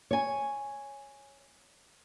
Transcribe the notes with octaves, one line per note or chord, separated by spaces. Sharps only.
C#5 G#5